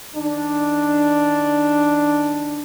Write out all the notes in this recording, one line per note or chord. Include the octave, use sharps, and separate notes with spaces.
D#3 D4